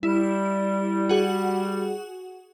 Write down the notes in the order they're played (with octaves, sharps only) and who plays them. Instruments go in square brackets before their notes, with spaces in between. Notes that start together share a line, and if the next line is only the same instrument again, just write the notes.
[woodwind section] G3 [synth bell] E4
[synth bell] F#4 G#4 F#5